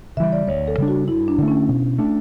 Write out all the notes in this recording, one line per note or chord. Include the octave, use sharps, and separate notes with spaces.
C#3 E3 G3 E5
D5
D2 C#5
A4
C#3 G3 D4
F#4
G2 E4
D4
D3 A3
C#4
B2
A3 D4